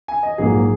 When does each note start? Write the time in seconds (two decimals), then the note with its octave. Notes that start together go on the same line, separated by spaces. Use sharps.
0.08 G#5
0.23 D#5
0.38 A#1 G#2 F#3 A#3 G#4